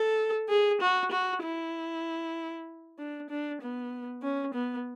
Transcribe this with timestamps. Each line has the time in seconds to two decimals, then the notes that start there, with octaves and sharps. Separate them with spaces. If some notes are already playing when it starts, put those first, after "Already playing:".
Already playing: A4
0.49 G#4
0.81 F#4
1.12 F#4
1.42 E4
2.98 D4
3.30 D4
3.61 B3
4.23 C#4
4.54 B3